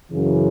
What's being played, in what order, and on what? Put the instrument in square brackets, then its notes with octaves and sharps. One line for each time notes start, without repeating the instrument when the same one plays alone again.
[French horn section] F#2 C#3 E3